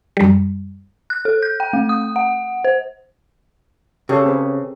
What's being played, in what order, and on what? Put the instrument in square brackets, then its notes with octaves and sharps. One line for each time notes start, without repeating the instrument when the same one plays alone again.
[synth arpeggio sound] F#2 G3
[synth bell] F#6
A4
G6
G5
A3
D#6
F#5
C5
[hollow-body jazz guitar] C#3 [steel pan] G4 A4 C#5
[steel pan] C4 G#4 B4